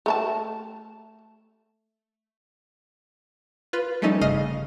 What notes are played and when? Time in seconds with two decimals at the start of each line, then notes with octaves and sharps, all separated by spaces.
0.06 A3 A#4 A5
3.73 F4 B4
4.02 F3 G3 A3 C#4 D#4 A4
4.21 G1 C#3 D#5 F6 C7